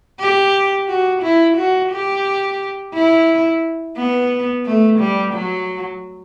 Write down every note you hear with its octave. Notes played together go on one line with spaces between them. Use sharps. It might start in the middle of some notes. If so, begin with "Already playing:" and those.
G4
F#4
E4
F#4
G4
E4
B3
A3
G3
F#3